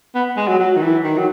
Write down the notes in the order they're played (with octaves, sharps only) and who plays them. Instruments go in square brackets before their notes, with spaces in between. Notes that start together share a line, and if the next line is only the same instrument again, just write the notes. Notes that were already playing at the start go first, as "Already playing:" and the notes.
[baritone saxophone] B3
G#3
F#3
F#3
D#3
E3
D#3
F#3